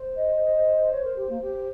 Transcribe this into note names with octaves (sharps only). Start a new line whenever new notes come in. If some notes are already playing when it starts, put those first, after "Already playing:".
Already playing: C5
D#5
C#5
A#4
G4
A#3
G4